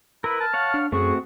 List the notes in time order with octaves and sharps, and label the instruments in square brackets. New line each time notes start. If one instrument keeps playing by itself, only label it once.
[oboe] E4 [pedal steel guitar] A#4 B4 [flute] B5
[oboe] A5 [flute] F6
[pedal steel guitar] C#5 F5 F#5
[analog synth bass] D4
[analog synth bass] F#2 [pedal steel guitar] A3 C4 F#4 [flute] G#4 [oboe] C#6